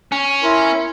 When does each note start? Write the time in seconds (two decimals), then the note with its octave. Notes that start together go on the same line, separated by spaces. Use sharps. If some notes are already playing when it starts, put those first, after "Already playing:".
0.12 C#4
0.43 E4 A#4 C6